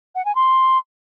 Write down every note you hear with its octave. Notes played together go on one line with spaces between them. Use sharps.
F#5
G#5
C6